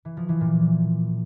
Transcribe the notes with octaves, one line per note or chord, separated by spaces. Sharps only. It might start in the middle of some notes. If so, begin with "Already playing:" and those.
E3
F3
E3
A#2